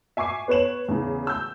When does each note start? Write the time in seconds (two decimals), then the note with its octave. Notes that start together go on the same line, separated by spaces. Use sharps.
0.17 E5 G#5 C#6 D6 C7
0.48 B3 B4 C#5 E7 F#7
0.88 E2 C#3
1.27 E6 G6